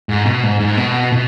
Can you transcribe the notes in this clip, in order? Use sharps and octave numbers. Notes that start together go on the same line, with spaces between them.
G#2
B2
G#2
G#2
B2
B2